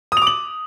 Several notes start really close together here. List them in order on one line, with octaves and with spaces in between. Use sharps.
D#6 F7 D6 F#7